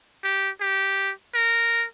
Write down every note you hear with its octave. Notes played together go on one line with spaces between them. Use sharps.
G4
G4
A#4